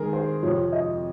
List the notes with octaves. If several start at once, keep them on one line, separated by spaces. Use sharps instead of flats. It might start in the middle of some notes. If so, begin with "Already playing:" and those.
Already playing: D#3 G#3 G#4 A#4
C5
F2 C3 F3 C#5
D#5